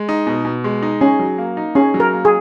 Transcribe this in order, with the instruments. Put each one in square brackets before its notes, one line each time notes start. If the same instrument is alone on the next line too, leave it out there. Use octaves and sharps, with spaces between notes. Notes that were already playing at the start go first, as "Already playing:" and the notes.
Already playing: [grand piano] G#3
D#4
B2
B2
G#3
D#4
[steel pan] C#4 [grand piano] G#4
[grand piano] F#3
A#3
D#4
[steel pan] C#4 [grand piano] G#4
[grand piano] F#3
[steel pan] A#4
[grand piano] A#3
[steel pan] G#4